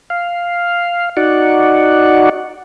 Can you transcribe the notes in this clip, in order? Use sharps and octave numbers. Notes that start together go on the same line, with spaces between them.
F5
D#4 F#4 D5 F#5